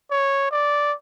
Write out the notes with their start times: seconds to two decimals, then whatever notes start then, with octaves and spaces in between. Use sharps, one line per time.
0.11 C#5
0.51 D5